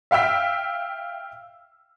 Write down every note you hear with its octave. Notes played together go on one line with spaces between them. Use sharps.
E5 F5 G5 E6 B6